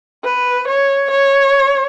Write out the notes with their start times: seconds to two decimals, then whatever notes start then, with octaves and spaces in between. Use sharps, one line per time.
0.24 B4
0.68 C#5
1.11 C#5